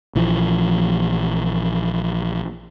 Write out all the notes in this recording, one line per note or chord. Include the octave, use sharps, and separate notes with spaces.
A#1 E3 F3